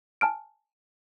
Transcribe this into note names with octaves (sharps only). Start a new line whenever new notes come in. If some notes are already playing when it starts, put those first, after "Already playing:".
G#5 A5 F6 D7